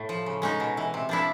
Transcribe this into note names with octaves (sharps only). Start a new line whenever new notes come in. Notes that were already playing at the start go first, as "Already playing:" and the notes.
Already playing: A2
F3
C#3
G#3 C#4 D#4
B2
E3
C3
F3 D4 E4